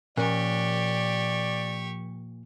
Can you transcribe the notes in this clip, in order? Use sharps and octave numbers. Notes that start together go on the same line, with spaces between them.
A#2 F3 C#4 G4 D5 C#6